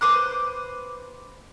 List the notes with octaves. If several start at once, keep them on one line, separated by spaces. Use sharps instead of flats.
B4 C5 D6 F#6